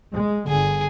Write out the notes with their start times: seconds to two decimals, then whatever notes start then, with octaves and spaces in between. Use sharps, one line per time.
0.15 G#3
0.48 G1 D3 G#4